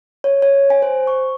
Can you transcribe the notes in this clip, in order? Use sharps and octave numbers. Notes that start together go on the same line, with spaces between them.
C#5
C#5
G#5
C5
C#6